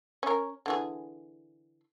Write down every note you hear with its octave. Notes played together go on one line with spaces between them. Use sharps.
C#4 A#4
D3 E3 G#4